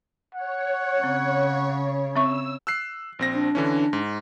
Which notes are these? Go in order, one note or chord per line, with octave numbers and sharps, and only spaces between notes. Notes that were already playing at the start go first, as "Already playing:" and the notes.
C#5 F#5
C#3 C4
C4 E5 C#6 E6
E6 F#6 C7
A#1 C4 A#6
D4
D3 E3 C#4
G#2